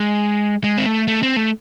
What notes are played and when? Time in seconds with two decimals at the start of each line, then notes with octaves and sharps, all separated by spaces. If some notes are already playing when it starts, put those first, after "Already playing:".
Already playing: G#3
0.64 G#3
0.78 C4
0.86 A3
1.08 A3
1.23 C4
1.36 A3